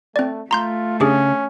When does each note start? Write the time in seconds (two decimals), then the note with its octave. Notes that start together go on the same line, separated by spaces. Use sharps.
0.16 A3 C4 D5
0.51 A3 F4 A#5 C6 G6
1.00 C#3 C#4 D4 G4 G#4